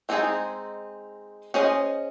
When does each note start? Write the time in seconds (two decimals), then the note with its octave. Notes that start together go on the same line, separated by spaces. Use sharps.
0.09 G#3 C4 D#4 G#4
1.54 C#4 G#4 C5 D#5